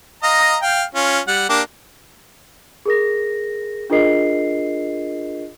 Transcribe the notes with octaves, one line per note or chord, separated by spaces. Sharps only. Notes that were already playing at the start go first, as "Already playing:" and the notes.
D#5 F5 A#5
F5 G5
C#4 F4
G3 F#5
A#3 D4 G4
G#4 A#4 A#6
D4 F4 G#4 A#4 D#5 C7